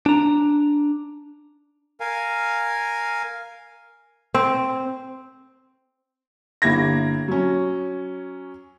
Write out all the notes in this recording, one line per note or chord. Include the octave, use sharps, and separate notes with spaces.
D4 A#5
A#4 F5 G#5
C4
G1 A#3 E4 G4 G#6 A#6
F#3 C#4